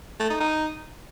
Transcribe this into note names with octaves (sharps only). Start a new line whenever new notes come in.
A3
D#4
D#4